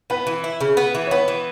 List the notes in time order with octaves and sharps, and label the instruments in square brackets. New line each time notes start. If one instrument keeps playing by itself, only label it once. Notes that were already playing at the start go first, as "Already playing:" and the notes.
[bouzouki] B3 [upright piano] B4
[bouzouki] E3
E4
C#3
B3
E3
[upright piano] C#5
[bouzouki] B3 [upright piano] B4
[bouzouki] E3